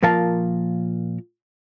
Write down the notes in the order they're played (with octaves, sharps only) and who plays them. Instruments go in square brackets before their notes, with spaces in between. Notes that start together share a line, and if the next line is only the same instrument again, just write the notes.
[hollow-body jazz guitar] A#2 F3 A#4 F5 A5